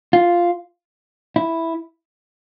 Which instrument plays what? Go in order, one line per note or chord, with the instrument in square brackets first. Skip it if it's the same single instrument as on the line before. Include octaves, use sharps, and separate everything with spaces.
[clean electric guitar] F4
E4